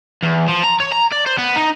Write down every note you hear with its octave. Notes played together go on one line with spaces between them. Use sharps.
E2
F3
A#5
C#5
A#5
D5
C5
B3
D#4